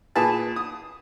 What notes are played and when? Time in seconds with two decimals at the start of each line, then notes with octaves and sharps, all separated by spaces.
0.16 A#2 G#4 B4 A5
0.56 D#6